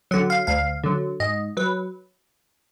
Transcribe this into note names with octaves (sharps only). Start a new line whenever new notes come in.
D3 F#3 F#5
F5
D2 F5
D3 F#3
G#2 D#5
F#3 B4